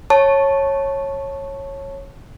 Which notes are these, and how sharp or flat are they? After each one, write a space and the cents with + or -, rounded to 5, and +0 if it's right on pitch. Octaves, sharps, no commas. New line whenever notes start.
C#5 -15 A5 -5 C#6 +0